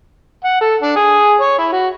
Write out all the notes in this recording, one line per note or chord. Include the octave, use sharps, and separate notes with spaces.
F#5
A4
D4
G#4
C#5
E4
F#4